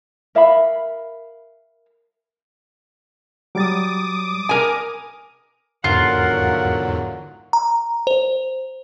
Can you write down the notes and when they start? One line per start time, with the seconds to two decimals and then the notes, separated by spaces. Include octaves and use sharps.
0.35 A#4 E5 F5 B5
3.55 F#3 G3 D6 D#6 A6
4.49 A#4 G#5
5.84 E2 G#2 D3 F#3 F4 A#4 F#5
7.53 A#5
8.07 C5